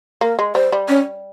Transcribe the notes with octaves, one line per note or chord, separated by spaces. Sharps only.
A#3 A#4
G#3
G3 C5
G3
C#4